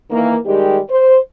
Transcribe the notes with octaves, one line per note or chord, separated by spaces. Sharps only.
D#3 E3 A#3
D#3 G3 G#3 G4
C5